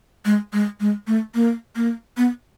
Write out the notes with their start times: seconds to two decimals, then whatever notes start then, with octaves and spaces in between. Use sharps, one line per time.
0.25 G#3
0.53 G#3
0.80 G#3
1.07 A3
1.35 A#3
1.76 A#3
2.17 B3